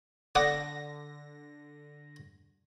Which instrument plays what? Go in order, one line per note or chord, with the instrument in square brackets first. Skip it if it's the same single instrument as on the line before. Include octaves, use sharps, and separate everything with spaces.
[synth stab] D3 A#6 [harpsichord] F#5 D6 D#6